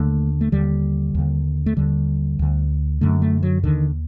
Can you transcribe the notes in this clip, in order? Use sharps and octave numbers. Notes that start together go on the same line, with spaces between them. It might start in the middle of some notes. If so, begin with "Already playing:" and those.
Already playing: D#2 D3 A3
A3
D#2 D3 G3
D#2 D3
A3
D#2 D3 G3
D2 D3
F#2 D3 A3
A3
F#3
D#2 D3 D#3